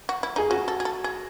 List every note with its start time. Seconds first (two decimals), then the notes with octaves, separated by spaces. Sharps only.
0.09 F#4
0.23 E4
0.36 D#4 G#4
0.50 C#4 F#4
0.68 A4
0.80 G#4
0.85 A4
1.04 G#4